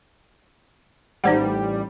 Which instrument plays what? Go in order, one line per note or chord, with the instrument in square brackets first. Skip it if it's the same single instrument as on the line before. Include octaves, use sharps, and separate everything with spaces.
[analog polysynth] A1 G3 [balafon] D#4 C5 F#5